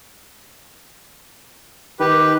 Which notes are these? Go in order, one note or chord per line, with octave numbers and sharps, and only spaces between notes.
D#3 G4 B4